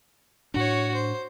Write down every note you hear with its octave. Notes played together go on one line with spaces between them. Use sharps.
A2 D4 F#4 C#5
C5